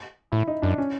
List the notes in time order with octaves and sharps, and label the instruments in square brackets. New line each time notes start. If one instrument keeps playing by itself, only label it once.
[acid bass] A2 [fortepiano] E4
[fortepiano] D#4
[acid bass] F#2 [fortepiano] D4
[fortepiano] C#4